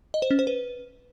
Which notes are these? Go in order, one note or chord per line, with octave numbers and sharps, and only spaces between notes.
D#5
C5
C#4
C5
B4